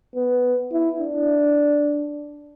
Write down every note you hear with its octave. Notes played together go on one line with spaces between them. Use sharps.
B3
E4
D4